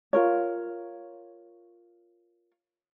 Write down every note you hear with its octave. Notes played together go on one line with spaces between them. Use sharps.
F4 A#4 C#5